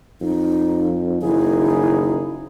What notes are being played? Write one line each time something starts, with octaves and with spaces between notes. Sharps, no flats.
F2 D#4
F#1 D#3 D#4 E4 G#4